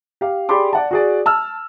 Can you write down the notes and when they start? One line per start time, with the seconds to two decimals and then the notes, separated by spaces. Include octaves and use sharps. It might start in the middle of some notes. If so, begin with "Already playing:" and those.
0.21 G4 F5
0.49 G4 G#4 D5 B5 C6 D6
0.73 D5 F#5 A5
0.91 F#4 G#4 D5
1.26 A5 E6 F6